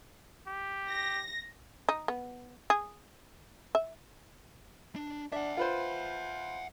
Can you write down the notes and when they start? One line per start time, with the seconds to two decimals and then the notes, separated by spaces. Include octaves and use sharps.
0.47 G4
0.89 A#6
1.89 D#4
2.08 B3
2.70 G#4
3.75 E5
4.96 D4
5.32 D4 E5 F#5
5.57 F4 B4 C5